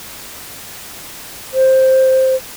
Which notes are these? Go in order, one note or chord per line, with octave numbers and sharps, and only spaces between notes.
C5